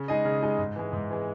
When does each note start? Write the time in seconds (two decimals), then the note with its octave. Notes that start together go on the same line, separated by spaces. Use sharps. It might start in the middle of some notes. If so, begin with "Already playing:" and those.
Already playing: C#3
0.08 G#3 D#4 G#4 D#5
0.25 C#3
0.42 G#3 D#4 G#4 D#5
0.58 G#2
0.76 E3 G#3
0.93 G#2
1.11 E3 G#3